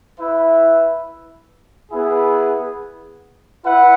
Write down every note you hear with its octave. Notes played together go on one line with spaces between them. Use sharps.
E4 B4 E5
B3 E4 G#4
E4 B4 F#5